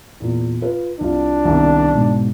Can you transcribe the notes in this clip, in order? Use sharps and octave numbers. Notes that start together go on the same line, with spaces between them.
E2 A#2
F4 B4
C2 D4 F4
C2 D#3 B3
G#2 B2